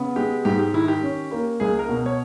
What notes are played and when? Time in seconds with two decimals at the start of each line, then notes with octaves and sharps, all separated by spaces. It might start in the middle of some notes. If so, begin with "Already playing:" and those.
Already playing: C#3 B3
0.16 G#3 G4
0.45 G#2 G4
0.59 G4
0.73 D#3 E4
0.88 G4
1.03 C#4
1.31 A#3
1.60 C#2 G#4
1.79 A#4
1.89 B2
2.06 C#5